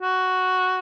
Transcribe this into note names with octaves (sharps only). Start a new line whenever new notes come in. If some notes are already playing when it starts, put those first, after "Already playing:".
F#4